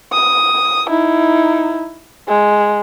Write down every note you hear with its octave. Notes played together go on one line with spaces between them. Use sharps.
D#6
D#4 E4
G#3